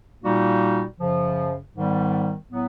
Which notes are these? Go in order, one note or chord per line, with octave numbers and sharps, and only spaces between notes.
A#2 G3 A#3 D#4 F#4
F#2 C#3 F3
G#2 D#3 G3 B3
A2 F#3 B3